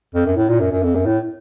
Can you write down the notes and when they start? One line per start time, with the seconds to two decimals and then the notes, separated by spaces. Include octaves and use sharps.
0.15 F2
0.26 F#2
0.37 A2
0.49 A#2
0.60 F#2
0.72 F#2
0.83 F2
0.95 F#2
1.06 A2